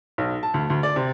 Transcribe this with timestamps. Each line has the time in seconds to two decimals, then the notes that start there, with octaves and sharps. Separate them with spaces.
0.18 B1
0.43 A5
0.54 D2
0.70 D2
0.83 D5
0.96 C3